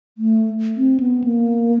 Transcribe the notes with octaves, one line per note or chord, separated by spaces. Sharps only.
A3
C4
B3
A#3